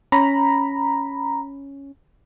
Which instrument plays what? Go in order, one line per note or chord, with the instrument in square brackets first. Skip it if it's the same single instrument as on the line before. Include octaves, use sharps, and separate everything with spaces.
[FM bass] C#4 [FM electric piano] A#5 B5